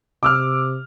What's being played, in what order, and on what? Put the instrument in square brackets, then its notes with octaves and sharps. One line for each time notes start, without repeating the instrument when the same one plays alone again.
[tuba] C3 [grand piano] D6 E6 F6